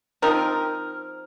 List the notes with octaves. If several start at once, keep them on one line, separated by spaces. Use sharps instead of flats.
F3 C4 D#4 A#4